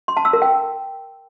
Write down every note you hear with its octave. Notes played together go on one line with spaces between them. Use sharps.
C6
A5
E6
A#4
G5